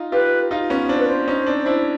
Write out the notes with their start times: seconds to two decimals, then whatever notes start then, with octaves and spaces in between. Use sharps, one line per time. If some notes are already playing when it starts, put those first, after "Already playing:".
Already playing: D#4 F4
0.12 F4 G4 B4
0.51 D#4 F4
0.70 B3 C#4
0.89 C4 D4 C5
0.99 B4
1.08 C5
1.28 C#4 D#4
1.47 C4 D4
1.66 D4 E4